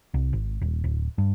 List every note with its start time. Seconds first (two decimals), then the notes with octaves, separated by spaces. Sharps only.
0.14 C2
0.33 G#1
0.62 D#1
0.84 D1
1.18 G2